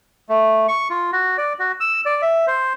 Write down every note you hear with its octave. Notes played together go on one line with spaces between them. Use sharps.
A3
C#6
F4
F#4
D5
F#4
E6
D5
E5
C5